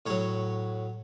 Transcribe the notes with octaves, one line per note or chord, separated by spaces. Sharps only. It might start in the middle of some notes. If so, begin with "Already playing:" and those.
A2 F#3 C#5